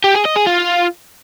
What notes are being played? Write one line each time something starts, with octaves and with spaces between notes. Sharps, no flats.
G4
G#4
D#5
G#4
F4